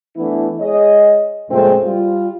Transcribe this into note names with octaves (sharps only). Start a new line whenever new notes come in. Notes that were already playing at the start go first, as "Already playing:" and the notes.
E3 A3 B3 D4 E4
G#3 G#4 C#5 D#5
F2 A#2 C#3 G#3 A3 C4
G3 F4